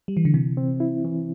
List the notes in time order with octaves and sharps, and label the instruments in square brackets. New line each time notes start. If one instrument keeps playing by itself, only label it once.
[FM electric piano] G3
E3
D3
[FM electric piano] C3 [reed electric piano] E3
[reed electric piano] C4
E4
E3